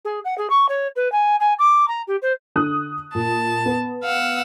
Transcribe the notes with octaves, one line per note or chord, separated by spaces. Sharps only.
G#4
F#5
G#4
C#6
C#5
B4
G#5
G#5
D6
A#5
G4
C5
D3 D#6 F#6
A#2 A5
B3
F5 F#5 E6